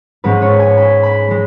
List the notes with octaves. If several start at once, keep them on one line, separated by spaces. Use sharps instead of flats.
G#2 G#3 C#4 B4
C#5
G#5
B5
B5
G#3